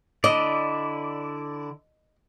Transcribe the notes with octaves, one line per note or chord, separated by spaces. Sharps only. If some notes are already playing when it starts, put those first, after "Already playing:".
D3 E4 D5 D#5